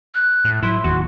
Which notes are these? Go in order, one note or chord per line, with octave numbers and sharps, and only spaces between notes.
F#6
A2
A2 F#3 E4 C6
D1 D#2 F#4